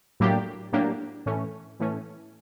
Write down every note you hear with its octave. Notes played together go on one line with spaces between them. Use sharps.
A2 F#3 A#3 D4 G4
A2 F#3 A#3 D4 G4
A2 E3 A3 C#4
A2 E3 A3 C#4